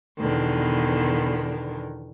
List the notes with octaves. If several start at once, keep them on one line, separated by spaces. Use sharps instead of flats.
E2 B2 D3 D#3